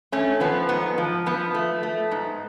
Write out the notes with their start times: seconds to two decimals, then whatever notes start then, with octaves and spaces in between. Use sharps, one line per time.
0.12 A3 C#4
0.40 F3 B3
0.69 G#2 B3
0.98 F3
1.26 F3 B3
1.55 A3
1.83 A3
2.11 G#2